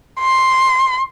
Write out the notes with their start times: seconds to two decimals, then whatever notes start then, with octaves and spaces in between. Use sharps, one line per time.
0.20 C6